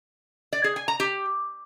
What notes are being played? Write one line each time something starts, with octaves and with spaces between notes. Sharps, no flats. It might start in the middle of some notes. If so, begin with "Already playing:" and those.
D5
G#4
G#5
A#5
G4